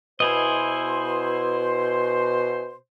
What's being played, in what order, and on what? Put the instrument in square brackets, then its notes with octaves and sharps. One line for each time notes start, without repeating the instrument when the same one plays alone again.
[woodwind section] B2 C5 C6 [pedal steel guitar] E4 G#4 D#5